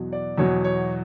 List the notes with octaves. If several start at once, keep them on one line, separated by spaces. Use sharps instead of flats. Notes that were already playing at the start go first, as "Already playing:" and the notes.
Already playing: E2 B2 F#3
D5
E2 B2 F#3 C#5
C#5